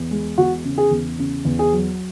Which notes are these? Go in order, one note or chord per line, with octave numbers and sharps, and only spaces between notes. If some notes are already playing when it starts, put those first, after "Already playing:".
Already playing: E2
G#3
E2 F#4
C#3
G#4
E2
C#3
E2
G#4
F#3